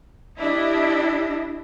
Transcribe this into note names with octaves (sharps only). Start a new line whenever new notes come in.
D4 E4 G4 D#5